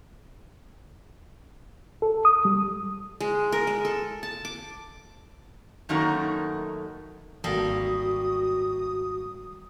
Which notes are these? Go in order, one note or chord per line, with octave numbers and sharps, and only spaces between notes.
A4
D#6
G3
G#3
A#4
G#3
A4
A5
D6
F#2 D#3 A3 A#3 D#4 F#4
G#1 G3 A#3 F#4 A4 D#6